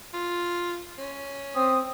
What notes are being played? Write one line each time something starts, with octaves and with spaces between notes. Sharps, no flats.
F4
C#4
C4 D#6